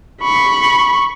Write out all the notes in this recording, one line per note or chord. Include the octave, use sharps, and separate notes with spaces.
B5 C#6